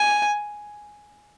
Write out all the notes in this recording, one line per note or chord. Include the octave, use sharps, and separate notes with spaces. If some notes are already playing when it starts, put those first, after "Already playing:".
Already playing: G#5